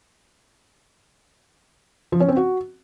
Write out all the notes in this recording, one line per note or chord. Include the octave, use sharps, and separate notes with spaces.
F3
C#4
C4
F#4